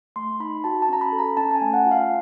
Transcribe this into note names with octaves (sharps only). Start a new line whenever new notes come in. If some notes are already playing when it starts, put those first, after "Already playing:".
A3 C6
D#4 B5
F#4 A5
A5
C#4 A#5
B5
A4
A#5
C#4 A5
A5
G#5
A3
F#5
F4
F5